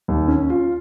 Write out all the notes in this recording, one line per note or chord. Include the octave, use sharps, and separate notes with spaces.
D#2
C#4
F4